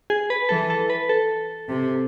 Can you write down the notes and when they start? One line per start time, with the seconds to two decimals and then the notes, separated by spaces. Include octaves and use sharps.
0.10 G#4
0.30 B4
0.49 E3 A4
0.70 A4
0.90 B4
1.09 A4
1.69 C3